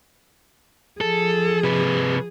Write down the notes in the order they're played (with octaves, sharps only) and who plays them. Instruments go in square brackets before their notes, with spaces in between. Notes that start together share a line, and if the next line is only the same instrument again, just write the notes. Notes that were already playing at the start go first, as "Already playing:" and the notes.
[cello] F3 G#4 [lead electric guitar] A4
[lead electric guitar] C3 B4